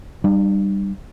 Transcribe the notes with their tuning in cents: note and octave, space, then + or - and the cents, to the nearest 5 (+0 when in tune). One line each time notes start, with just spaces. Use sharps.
G3 +0 D4 +45